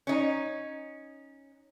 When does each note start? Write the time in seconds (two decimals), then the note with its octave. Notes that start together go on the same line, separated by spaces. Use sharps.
0.07 C#4 D#4